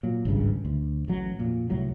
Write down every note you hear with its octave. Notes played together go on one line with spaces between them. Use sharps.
A#2 F#3
G#1 C#2 G2 C#3
D2
A1 F#3
F2 A#2
C2 A2 F#3